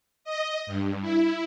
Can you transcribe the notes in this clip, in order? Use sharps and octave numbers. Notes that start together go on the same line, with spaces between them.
D#5
G2
E4